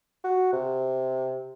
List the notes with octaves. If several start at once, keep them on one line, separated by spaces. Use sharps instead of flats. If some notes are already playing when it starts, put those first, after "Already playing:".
F#4
C3